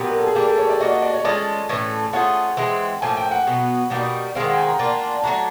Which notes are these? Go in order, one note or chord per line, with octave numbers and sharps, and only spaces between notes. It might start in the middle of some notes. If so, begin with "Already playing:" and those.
Already playing: A#2 F#3 B3 G4
A#4
A4
G#4
G3 A#3 D4 G4
A4
C#5
D5
A#3 D4 F#4 D#5
D#5
D5
C#5
G#3 C#4 F4 A4 D5
A2 E3 A3 C#4
A3 C#4 F4 G#4 F#5
E3 G#3 C4
A2 F3 A#3 G#5
G5
F#5
B2 F#3 B3
B2 G3 A#3 D#4
D#3 G#3 C4 F5
F#5
G5
G#5
A#5
A#3 D4 F4
F#3 A3 D4 A#5